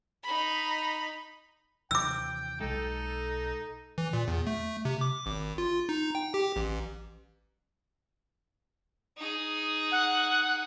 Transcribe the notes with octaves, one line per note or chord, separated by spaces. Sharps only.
D#4 B5
D#2 C3 E3 G5 D6 E6
B1 B2 G#3 D#4 A4
E3
A#2
E2
A3
C3
D6
G#1
F4
D#4
G5
G4
A1
D#4 G#4
F#5